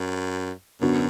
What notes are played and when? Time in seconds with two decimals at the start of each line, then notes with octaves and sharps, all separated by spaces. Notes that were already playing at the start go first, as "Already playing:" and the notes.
Already playing: F#2
0.81 F#2 D3 B3 D4 F#4